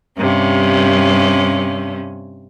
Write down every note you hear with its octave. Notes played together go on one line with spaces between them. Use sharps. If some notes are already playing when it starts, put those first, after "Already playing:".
G2 C3 C#4